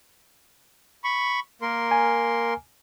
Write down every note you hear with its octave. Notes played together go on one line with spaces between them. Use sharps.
B5 C#6
A#3 A#4 C6
G#5